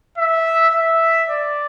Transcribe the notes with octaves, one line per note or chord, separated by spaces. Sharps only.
E5
E5
D5